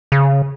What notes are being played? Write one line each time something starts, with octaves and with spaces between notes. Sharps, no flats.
C#3